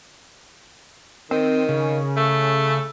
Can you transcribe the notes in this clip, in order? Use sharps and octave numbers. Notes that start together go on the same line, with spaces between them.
D#3 C4
C#3
A3